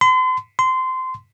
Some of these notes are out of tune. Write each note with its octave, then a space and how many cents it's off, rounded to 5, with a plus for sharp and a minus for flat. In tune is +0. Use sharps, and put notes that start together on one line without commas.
C6 -40
C6 -20